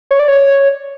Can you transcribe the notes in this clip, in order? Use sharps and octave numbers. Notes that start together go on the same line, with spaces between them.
C#5
D5
C#5